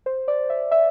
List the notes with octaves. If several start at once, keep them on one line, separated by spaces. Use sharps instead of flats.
C5
D5
E5
E5